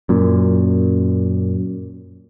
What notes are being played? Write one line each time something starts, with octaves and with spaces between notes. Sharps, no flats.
F#2 A#2